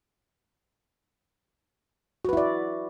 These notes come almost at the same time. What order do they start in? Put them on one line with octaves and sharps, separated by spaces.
F#4 B4 E4 D5